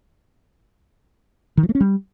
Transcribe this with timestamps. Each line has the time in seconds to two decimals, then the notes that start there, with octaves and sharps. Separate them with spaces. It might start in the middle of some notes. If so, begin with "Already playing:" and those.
1.57 D#3
1.63 F3
1.69 A3
1.75 C#4
1.80 G3